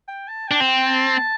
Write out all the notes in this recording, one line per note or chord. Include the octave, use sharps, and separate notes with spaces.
G5
A5
D4 G5
C4
G5
A5